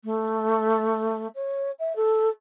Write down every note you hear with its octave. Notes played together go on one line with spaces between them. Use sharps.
A3
C#5
E5
A4